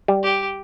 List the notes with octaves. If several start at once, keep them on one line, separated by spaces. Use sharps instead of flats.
G3
G4